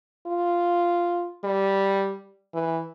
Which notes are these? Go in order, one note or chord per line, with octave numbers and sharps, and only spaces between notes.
F4
G3
E3